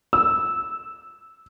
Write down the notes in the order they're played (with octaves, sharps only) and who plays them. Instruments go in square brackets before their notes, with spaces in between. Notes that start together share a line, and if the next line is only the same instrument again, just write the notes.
[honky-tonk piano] E6